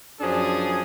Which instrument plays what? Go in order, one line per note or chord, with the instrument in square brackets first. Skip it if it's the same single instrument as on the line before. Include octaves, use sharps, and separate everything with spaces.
[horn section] F#2 F3 D4 G#4